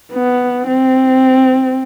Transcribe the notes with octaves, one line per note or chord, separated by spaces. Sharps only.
B3
C4